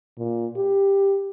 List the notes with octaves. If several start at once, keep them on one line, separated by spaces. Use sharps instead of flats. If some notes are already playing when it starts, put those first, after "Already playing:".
A#2
G4